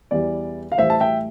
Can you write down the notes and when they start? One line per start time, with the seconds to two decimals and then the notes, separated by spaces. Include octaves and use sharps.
0.11 E2 E3 G3 D5
0.72 F5
0.78 A2 E3 G3 C5 E5
0.90 A5
1.00 E5 G5